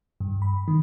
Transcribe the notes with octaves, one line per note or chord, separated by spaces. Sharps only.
G2
B5
D#3